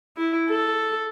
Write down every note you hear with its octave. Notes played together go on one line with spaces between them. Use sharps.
E4
A4